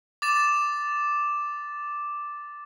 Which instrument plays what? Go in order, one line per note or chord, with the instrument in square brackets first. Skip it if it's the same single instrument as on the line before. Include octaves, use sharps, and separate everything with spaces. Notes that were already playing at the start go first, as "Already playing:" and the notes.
[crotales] D6 A6 E7